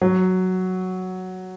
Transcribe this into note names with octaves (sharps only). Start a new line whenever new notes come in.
F#3